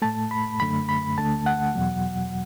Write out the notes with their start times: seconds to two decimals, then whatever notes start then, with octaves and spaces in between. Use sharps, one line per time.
0.02 A2 A3 A5
0.31 B5
0.60 F#2 D3 A3 B5
0.89 B5
1.18 D2 D3 A3 A5
1.46 F#5
1.75 E2 B2 F#3